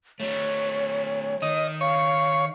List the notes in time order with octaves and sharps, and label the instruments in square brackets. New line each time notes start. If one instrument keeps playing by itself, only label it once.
[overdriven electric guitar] F#3 A3 [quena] C#5
[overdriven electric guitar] D#3 [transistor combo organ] D#5
[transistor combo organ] C#5 [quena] F5